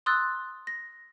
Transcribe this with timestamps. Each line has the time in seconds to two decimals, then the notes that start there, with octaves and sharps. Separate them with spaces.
0.06 C6 D#6 E6 F#6 A6
0.67 A#6